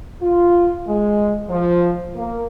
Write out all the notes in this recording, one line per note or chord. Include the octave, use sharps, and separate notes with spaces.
F4
G#3
F3
A#3